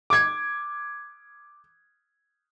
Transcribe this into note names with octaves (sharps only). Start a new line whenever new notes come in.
D6 G#6